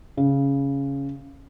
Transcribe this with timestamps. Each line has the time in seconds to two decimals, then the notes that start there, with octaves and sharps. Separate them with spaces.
0.17 C#3